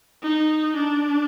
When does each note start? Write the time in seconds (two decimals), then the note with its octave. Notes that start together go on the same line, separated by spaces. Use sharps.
0.23 D#4
0.76 D4